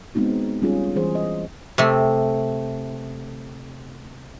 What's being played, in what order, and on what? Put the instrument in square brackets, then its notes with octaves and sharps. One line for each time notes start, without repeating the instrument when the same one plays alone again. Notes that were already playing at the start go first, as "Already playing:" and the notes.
[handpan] G#3 B3 C4 D#4 F#4
G3 C#4 F4 G#4
E3 G3 G#4 C5
D#5
[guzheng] C3 A3